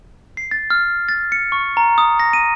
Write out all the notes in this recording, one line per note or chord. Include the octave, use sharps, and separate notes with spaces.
C7
A6
F6
A6
C#7
C#6
A#5
D#6
A#6
D#7